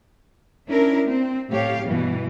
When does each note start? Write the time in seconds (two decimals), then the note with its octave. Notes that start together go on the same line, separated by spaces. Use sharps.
0.68 C#4 D4 E4 A#4
1.07 C4
1.50 A2 G4 C#5 F5
1.85 G2 B2 E3